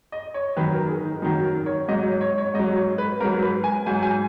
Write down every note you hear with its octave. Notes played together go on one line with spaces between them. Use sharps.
D#5
C#5
F#2 D#3 F#3 B4
A#4
G#4
D#4
F#2 D#3 F#3 D#4
A#4
C#5
G#2 F#3 D#5
C#5
C#5
C#5
G#2 D#5
F#3
C#5
B4
G#2 F#3 A#4
B4
G#5
G#2 F#3 G#5
G#5